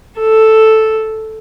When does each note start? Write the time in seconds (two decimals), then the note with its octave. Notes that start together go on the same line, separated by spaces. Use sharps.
0.20 A4